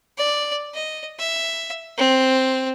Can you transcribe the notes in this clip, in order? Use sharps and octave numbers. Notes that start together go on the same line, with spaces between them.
D5
D#5
E5
C4